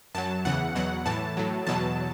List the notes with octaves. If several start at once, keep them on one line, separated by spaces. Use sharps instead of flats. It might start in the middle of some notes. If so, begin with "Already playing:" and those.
F#2 F#3 A5
E2 C#3 E3 F#5
E2 B2 F#3 F#5
A2 E3 A5
A2 F#3
E2 B2 F#3 A5